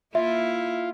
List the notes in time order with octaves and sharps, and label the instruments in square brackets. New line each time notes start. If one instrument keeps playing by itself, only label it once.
[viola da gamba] A#3 E4 [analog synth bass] F4 [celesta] E5